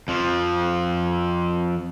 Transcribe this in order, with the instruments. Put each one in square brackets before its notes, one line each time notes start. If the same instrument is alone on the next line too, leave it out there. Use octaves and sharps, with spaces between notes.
[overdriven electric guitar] F2 F3